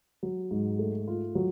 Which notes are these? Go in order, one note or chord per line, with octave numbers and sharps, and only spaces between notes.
F#3
G#2
A3
F4
F#3